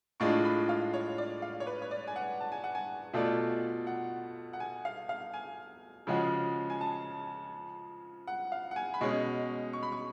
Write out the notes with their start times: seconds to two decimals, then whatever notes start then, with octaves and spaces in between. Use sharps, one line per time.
0.20 A2 G#3 D4 F4 C#6
0.45 B5
0.69 F5
0.94 C#5
1.18 D5
1.42 F5
1.60 C#5
1.67 B4
1.82 C#5
1.91 D5
2.08 G#5
2.16 F#5
2.40 A5
2.52 G#5
2.64 F#5
2.75 G#5
3.14 B2 A3 F4 A4 D5
3.87 F#5
4.53 F#5
4.60 G#5
4.85 F5
5.09 F5
5.34 G#5
6.07 C#3 F3 G#3 C#4 F#4
6.70 G#5
6.81 A5
8.27 F#5
8.52 F5
8.71 F#5
8.76 G#5
8.94 B5
9.01 B2 G#3 C#4 C#6
9.73 C#6
9.83 B5
9.92 C#6